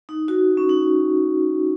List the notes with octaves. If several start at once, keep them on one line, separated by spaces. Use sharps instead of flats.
D#4
F#4
C#4
D#4